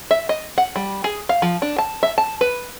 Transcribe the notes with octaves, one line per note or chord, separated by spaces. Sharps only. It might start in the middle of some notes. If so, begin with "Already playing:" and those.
E5
D#5
F#5
G3
G#4
F5
F3
D4
A5
E5
A5
B4